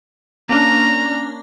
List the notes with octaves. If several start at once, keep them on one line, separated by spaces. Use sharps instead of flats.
A#3 C#4 D4 A#5